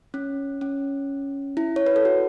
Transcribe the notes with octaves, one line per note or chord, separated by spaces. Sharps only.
C#4
C#4
E4
C#5
B4
A4
F#4